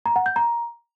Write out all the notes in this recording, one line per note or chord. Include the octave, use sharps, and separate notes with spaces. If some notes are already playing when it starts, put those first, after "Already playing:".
A#5
F#5
G6
A#5